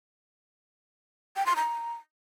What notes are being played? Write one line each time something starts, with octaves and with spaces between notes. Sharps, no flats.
G5
C6
A#5